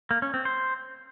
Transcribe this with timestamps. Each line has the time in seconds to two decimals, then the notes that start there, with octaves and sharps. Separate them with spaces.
0.11 A#3
0.22 C#4
0.34 C4
0.45 C5